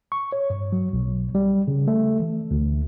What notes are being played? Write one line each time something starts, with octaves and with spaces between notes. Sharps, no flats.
C#6
C#5
G2
F#3
B1
G3
C#3
A3
E3
D2